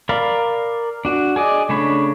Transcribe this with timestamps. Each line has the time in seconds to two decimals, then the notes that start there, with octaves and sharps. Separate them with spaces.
0.09 A#4 D5 F5 B5
1.05 D4 F#4
1.36 G#4 D5 D#5
1.69 C#3 A3 D4 C#5 B5